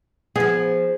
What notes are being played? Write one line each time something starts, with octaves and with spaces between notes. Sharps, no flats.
F3 B3 G#4